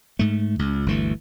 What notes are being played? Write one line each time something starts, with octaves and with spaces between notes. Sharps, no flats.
G#2 A3
C#2
G1 D2 E3 A3